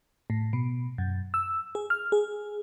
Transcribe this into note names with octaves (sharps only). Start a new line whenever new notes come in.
A2
B2
F#2
E6
G#4
F6
G#4